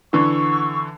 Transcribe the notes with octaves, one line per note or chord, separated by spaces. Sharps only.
D3 E3 C#6 E6